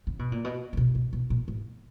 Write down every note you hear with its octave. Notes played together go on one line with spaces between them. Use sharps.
C#3
B2
A#2
B2
C#3
B2
B2
B2
A#2
G#2